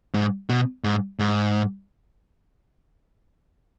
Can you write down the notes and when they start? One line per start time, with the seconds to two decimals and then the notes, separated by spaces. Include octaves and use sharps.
0.14 G#2
0.49 B2
0.84 G#2
1.19 G#2